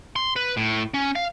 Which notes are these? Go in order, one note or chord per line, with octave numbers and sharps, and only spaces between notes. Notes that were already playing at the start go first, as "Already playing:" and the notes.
C6
B4
A2
C#4
F5